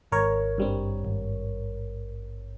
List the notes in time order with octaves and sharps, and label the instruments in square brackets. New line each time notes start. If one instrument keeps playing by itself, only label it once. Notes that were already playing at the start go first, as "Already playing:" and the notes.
[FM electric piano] G#1 A#4 C#5
G2 G3 C4
G#1